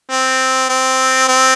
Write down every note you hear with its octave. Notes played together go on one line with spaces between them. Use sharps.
C4
C4
C4